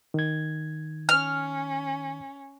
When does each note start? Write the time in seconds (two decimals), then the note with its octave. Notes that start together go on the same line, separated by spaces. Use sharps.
0.14 D#3 G#6
1.09 C#4 F6